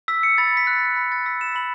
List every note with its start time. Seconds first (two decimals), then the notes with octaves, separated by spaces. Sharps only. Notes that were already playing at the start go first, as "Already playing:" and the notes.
0.08 E6 B6
0.23 C#7
0.38 B5 A6
0.57 B6
0.67 F#6
0.97 B5
1.12 A6
1.26 E6 B6
1.41 E7
1.55 B5 F#7